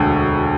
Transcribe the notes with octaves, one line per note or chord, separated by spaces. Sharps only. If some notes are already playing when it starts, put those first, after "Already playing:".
Already playing: E1 D2 D3